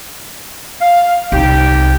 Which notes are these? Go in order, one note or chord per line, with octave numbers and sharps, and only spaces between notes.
F5
C2 D#4 G4